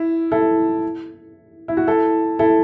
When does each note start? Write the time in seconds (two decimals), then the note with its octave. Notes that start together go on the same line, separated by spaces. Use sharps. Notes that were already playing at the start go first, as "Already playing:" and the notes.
Already playing: E4
0.32 E4 A4
1.68 E4
1.77 F#4
1.87 E4 A4
2.39 E4 A4